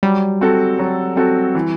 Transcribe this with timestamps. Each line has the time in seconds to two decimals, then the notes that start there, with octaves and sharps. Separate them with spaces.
0.03 F#3 G3
0.41 C4 F#4 A4
0.79 F#3
1.16 C4 F#4 A4
1.55 E3